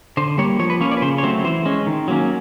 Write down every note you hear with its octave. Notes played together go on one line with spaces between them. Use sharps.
D3 C5
G3 A#3 C#5
F3 C#5
B4
A#3 C#4 C#5
D5
B4
C#3 C5
C#5
F#3 A3 C4 C5
E3 C5
G#3 C#4
D#3
F#3 A#3 C#4